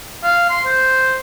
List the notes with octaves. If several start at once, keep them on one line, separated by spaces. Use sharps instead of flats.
F5
C6
C5